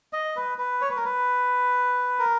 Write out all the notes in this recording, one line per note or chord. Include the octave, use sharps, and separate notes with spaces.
D#5
B4
B4
C#5
B4
A#4
B4
A#4